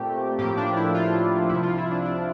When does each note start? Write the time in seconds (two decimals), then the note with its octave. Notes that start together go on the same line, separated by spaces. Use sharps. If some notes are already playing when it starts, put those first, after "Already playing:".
Already playing: A#2 A3 C4 G4
0.39 A2 F3 A#3 G4
0.57 D4
0.76 E4
0.94 F4
1.49 C2 C3 F3 E4
1.63 F4
1.78 E4
1.91 D4
2.06 D4